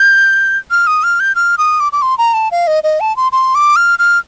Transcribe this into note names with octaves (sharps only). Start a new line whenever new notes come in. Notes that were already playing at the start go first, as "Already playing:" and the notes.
Already playing: G6
F6
D#6
F6
G6
F6
D#6
D6
D6
C6
A#5
A5
F5
D#5
D#5
A5
C6
C6
D6
F6
F6